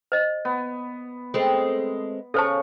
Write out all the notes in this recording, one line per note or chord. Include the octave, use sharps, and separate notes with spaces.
C5 D#5
B3
G#3 A3 C4
C#3 A4 C5 A5 C#6